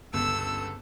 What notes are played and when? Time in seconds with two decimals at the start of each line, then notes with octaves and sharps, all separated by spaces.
0.13 G1 C#2 B3 A4 E6